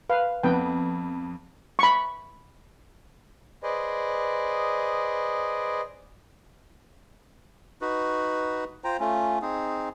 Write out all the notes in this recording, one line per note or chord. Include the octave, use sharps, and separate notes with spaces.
B4 F5
F2 B3 B4 G5
B5 C#6
G#4 B4 C5 D5 D#5
D#4 F#4 B4
F4 C5 G5 A#5
A3 C#4 F4
C4 D#4 G#4